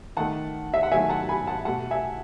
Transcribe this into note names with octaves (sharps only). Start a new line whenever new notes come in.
D#3 A3 F#5 A5
E5
F#5
D#3 F#3 A3 E5 G#5
F#5 A5
G#5 B5
F#5 A5
B2 A3 F#5 A5
E5 G#5